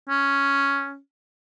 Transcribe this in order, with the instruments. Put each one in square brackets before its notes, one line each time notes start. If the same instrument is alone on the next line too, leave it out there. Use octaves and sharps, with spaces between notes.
[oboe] C#4